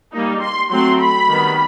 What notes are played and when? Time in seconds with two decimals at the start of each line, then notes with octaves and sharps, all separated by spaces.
0.12 G3 A#3 D#4
0.41 C6
0.70 F#3 A3 C4 C6
0.99 B5
1.29 D#3 G3 B3